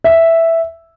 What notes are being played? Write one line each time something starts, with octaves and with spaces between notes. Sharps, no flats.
E5